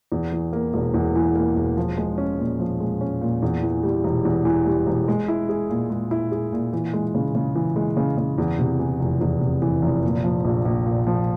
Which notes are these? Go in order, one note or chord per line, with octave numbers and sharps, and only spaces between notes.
E2
E3
A#3
E1
E2
E3
A#3
E1
F3
G#3
C#4
A#2
F3
G#3
C#4
A#2
E2
E3
G3
E1
E2
E3
G3
E1
G#3
E4
G#4
A#2
G#3
E4
G#4
A#2
E3
G#3
C#3
C#3
E3
G#3
C#3
C#3
E2
C3
E3
F1
E2
C3
E3
F1
A#2
F3
A#1
A#1
A#2
F3